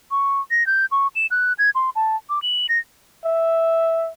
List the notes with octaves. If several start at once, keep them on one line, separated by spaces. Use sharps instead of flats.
C#6
A#6
G6
C#6
E7
F#6
G#6
C6
A5
D6
F#7
A#6
E5